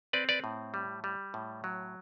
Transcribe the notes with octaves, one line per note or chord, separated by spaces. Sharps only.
C4 B4 D5
B4 D5
A2
G3
G3
A2
F#3